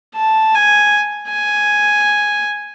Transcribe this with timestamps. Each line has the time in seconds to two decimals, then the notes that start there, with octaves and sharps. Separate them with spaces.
0.15 A5
0.55 G#5
1.32 G#5